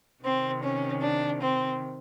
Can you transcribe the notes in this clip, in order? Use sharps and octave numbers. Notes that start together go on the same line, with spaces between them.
C3 D#3 C4
C#4
D4
C4